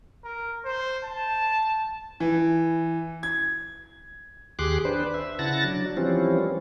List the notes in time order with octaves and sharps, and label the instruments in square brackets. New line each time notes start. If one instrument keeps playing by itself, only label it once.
[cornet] A#4
C5
A5
[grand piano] E3
G#6
[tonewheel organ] D#2 G4 G#4 C6 D6 F#6
D4 B4 C5
E5
C#3 E4 F#5 A5 A6 A#6
F#3 D4
E3 F3 G3 C4 C#4